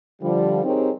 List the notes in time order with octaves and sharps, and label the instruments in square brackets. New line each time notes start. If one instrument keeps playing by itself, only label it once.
[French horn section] D3 F3 G3
C4 D#4 G4 G#4 A#4 C#5